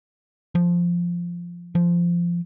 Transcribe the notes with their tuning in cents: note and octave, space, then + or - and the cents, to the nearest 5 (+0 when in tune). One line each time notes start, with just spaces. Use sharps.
F3 -5
F3 -15